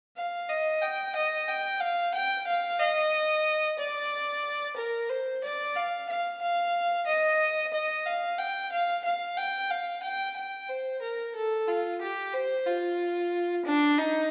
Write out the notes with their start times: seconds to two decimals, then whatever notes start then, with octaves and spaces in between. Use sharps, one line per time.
0.17 F5
0.49 D#5
0.82 G5
1.15 D#5
1.48 G5
1.80 F5
2.14 G5
2.47 F5
2.80 D#5
3.78 D5
4.76 A#4
5.10 C5
5.43 D5
5.76 F5
6.09 F5
6.41 F5
7.07 D#5
7.73 D#5
8.06 F5
8.38 G5
8.72 F5
9.04 F5
9.37 G5
9.70 F5
10.03 G5
10.36 G5
10.69 C5
11.02 A#4
11.35 A4
11.67 F4
12.01 G4
12.34 C5
12.66 F4
13.65 D4
13.98 D#4